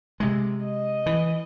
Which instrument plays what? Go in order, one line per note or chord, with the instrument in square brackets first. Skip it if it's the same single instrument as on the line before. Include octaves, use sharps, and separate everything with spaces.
[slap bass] C3 G#3
[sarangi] D#5
[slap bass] E3